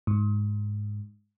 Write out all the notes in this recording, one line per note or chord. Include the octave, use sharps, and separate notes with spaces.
G#2